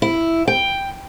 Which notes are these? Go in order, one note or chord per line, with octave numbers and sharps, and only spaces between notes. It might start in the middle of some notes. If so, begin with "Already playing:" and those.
E4
G5